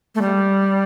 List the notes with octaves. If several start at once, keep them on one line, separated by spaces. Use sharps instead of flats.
A3
G3